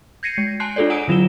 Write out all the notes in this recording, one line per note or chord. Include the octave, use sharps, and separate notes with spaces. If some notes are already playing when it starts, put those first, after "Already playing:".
G6 G#6 A#6 C7 C#7 D#7
G#3
G#5 A5 C6 F#6 C7
D4 F4 G#4 A4 C#5 D5
F#5 G#5 A#5 D#6 E6 D7
D3 F#3 F4 E7 G7